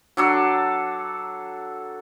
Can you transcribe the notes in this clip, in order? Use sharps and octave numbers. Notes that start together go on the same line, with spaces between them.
F#3 D4 A4